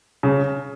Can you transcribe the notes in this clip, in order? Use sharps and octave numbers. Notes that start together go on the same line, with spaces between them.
C#3